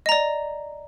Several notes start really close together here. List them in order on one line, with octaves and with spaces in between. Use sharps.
D#5 A#5 D5